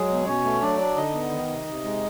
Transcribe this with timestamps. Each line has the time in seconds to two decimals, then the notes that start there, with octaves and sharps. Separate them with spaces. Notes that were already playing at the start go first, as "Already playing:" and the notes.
Already playing: F#3 G#3 G#4
0.09 B2
0.26 B2 C#4 C#5
0.44 A3
0.61 F#3 D4 D5
0.79 D4
0.96 D3 D#4 D#5
1.14 B3
1.31 D#3
1.49 C3
1.67 C3
1.84 G#3